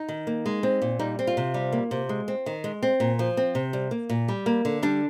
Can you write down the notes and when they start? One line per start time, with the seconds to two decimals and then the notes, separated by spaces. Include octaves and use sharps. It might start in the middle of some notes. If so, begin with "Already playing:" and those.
Already playing: D#4
0.09 D#3
0.27 A#3
0.46 G#3
0.63 C4
0.82 A#2
0.99 G3 D#4
1.19 C4
1.27 F4
1.37 C3
1.54 G3
1.72 A#3
1.91 C3
2.09 G#3
2.28 C4
2.46 D#3
2.64 G#3
2.83 C4
3.00 A#2
3.19 F3
3.37 C4
3.55 C3
3.73 G3
3.91 A#3
4.09 A#2
4.28 G3
4.46 A#3
4.65 D3
4.82 G3 D4